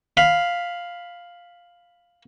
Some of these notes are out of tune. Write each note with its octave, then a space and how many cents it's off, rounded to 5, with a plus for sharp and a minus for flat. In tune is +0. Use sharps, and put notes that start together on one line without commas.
F5 +5 B5 +5